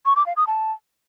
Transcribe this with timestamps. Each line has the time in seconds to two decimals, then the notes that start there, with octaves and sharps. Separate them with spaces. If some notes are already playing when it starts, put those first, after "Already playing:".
0.06 C#6
0.16 D6
0.26 F5
0.37 D#6
0.47 A5